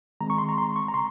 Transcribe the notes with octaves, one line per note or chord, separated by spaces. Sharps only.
D#3 G#3 C4 A#5
C#6
C6
A#5
C6
C#6
A#5
C#3 C6